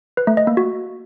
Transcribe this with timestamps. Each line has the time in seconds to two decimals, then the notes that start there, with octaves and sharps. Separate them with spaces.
0.17 B4
0.27 A3
0.37 D#5
0.47 A#3
0.57 F#4